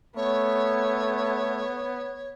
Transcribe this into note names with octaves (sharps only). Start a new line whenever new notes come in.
A3 B3 C#5